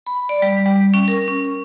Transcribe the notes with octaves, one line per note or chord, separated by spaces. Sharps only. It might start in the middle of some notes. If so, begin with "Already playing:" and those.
B5
D5
G3
G3
C#4
A#4
C#4